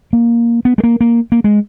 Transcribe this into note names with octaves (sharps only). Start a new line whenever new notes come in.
A#3
B3
G#3
A#3
A#3
A#3
G#3